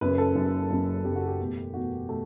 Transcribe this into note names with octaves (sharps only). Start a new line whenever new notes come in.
F#1 F#2 C#3 B4
A4
F#1 F#2 C#3
F#1 F#2 C#3
F#1 F#2 C#3 G4
F#4
G4
E2 B2 A3
E2 B2 A3 F#4
B2 A3